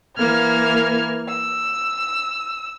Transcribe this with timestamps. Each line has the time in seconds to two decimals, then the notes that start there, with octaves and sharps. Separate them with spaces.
0.17 E3 A#3 F6 G#6
1.29 E6